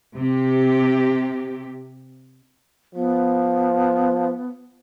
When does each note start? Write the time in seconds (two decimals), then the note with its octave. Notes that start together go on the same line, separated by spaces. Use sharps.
0.16 C3 G4
2.95 F3 B3